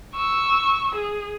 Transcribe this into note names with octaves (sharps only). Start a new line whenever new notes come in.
C#6 E6
G#4